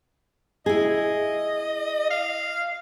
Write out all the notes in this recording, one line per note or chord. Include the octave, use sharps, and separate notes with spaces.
E4 G#4 D#5
F5